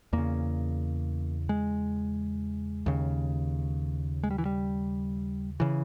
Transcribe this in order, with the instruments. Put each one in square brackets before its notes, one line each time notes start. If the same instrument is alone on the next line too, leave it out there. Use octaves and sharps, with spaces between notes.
[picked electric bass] E2 C#3 A#3
G#3
D#2 C#3
G#3
G3
E3
G3
C#3 E3